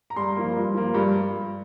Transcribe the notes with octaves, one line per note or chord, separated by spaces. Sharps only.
A#5
G2 C6
F3 A#3
G2
F3 A#3
G2